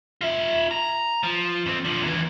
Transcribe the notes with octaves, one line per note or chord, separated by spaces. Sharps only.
F4 E5
A#5
F3
F2 C4
D3 F3
D#2 E3